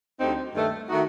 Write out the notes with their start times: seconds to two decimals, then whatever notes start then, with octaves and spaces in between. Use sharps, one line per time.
0.19 D2 D3 G3 C4 D#4
0.55 G2 D#3 A3
0.89 D#3 A3 D#4 F#4